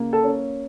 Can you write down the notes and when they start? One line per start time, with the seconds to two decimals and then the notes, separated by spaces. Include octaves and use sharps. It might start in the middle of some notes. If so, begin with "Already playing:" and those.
Already playing: C#3 A#3
0.13 A4
0.23 C#4